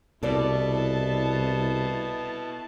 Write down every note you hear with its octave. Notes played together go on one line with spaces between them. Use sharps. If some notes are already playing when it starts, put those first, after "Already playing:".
C2 B2 E4 A4 D5 A5